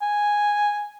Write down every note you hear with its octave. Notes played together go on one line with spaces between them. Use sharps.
G#5